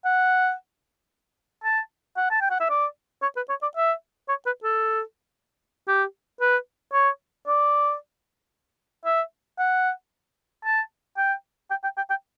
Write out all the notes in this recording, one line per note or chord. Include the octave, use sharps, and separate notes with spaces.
F#5
A5
F#5
A5
G5
F#5
E5
D5
C#5
B4
C#5
D5
E5
C#5
B4
A4
G4
B4
C#5
D5
E5
F#5
A5
G5
G5
G5
G5
G5